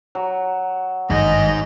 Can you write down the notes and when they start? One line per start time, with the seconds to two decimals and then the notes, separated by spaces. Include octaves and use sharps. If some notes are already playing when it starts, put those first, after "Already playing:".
0.15 F#3
1.10 G#1 G2 G3 D#4 G#4 D#5